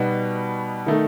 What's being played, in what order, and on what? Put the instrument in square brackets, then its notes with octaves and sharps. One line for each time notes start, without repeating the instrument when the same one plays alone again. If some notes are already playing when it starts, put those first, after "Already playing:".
Already playing: [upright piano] B2 G3 B3 D#4 F#4
D#3 A3 D#4